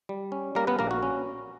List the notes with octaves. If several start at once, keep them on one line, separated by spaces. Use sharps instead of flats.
G3
C#4
G3 A#3 A#4
B3 B4
A#1 A#3 A#4
F#4
C#4